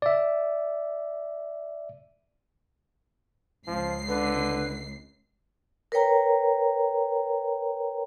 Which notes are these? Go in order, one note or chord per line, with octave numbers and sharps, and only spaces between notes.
D5 E5
C#2 F3 C7
D3 B4
A#4 B4 C#5 G5 A#5